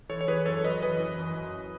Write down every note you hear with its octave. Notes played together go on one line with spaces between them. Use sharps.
E3 A4 C#5
C#5
E3 G#4 B4
F#2 A4 C#5
F#2 B4 D#5
E3 B4 D#5
E3
F#2
F#2